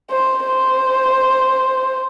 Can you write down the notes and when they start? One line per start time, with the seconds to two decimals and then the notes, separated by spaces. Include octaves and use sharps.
0.11 C5
0.47 C5